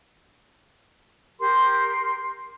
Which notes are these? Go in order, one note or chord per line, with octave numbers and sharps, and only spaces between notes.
G4 A#4 C6